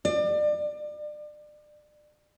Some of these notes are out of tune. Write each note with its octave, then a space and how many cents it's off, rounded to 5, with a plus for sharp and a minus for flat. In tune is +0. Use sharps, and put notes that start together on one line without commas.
D5 +30